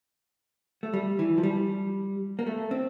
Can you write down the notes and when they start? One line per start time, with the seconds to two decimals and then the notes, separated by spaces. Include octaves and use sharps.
0.83 A3
0.94 G3
1.19 E3
1.38 F3
1.43 G3
2.39 A#3
2.46 A3
2.71 C4